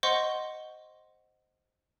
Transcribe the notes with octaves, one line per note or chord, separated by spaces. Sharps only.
C5 D#5 F#5 C6 C#6